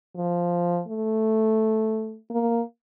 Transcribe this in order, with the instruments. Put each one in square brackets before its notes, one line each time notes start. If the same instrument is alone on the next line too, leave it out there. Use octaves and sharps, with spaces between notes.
[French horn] F3
A3
A#3